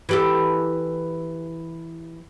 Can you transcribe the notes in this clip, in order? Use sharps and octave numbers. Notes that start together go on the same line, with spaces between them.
E3 G4 A4